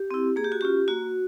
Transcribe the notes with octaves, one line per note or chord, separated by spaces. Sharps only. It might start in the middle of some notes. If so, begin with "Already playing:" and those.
Already playing: G4
C4 E4
A#3 G#4
G4
F#4
C#4 F4 G4
A#3 F#4